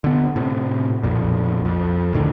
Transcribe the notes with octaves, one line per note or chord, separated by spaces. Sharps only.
D3 B3
A2 C3
B1 F2 A#2
F2
C#2 A2 D3 D#3